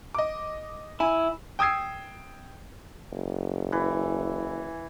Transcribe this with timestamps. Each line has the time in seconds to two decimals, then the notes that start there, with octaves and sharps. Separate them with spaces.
0.15 D#5 D6
1.00 E4 G#5
1.59 G5 D#6 E6 G#6 C7
3.12 F#1
3.72 E3